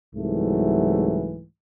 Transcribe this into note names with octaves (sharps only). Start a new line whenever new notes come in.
C2 G#2 E3 F#3 A3